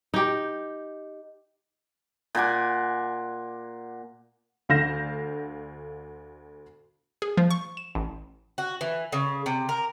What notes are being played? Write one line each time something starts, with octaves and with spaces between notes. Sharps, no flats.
D#4 G4
A#2 F#5 G#5 D6
D2 D3 F5 G6 A#6 E7
G#4
F3
C#6
E7
A1
F#4
E3
C#3
C3
A#4